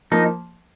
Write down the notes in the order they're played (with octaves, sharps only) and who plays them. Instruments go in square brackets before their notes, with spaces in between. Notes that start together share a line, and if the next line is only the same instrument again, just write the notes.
[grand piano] F3 A#3 [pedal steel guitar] D#4